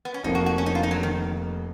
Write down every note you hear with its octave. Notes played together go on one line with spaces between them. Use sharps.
B3
C#4
F1 F2 F3 A#3 D#4
F#4
F#4
C#4
D#4
F4
D#4
F#3
D#3